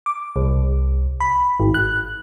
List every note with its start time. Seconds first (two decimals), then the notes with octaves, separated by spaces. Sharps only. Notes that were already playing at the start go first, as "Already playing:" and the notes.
0.06 D6
0.36 C2
1.20 B5
1.60 G#1
1.74 F#6